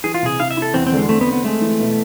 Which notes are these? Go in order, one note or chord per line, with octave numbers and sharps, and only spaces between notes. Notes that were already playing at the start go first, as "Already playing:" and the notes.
E3 G#4
F4
C3 G#4
E4 F5
E5
E4
A4
E2 C4
C4
D3
G#3
A3 C4
B3
C4
B3
G#3 A3
E3
B2